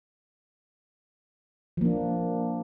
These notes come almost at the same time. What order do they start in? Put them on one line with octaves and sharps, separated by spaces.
F3 A#3 D4